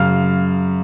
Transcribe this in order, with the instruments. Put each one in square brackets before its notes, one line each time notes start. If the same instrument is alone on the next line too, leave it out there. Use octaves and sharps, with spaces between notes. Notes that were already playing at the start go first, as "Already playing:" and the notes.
Already playing: [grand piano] F#2 C#3 F5 F6